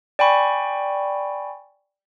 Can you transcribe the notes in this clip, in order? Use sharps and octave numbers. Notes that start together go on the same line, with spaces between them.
D5 G5 G#5 B5 C#6